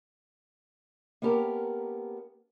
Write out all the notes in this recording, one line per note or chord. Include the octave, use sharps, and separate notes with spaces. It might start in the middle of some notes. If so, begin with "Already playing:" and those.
A#3 B3 C#4 G4 A4 A#4